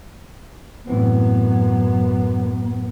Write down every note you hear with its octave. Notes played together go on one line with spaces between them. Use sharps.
F#2 A2 E3 B3 C4